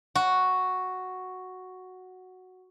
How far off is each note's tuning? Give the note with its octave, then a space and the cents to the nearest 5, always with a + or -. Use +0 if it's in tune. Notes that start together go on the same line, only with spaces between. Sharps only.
F#4 +0